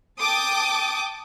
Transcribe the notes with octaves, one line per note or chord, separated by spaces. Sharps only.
G5 A5 D6 D#6